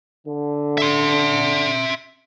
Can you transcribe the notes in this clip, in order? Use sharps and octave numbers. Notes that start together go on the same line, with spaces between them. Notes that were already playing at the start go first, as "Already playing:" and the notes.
D3
E5 C6